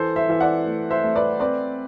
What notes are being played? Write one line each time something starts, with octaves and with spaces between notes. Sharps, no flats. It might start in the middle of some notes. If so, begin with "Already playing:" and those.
Already playing: E3 A4 C5
C5 E5
E3 E5
D5 F#5
A3
C5 E5
A3
B4 D5
C4 B4 D5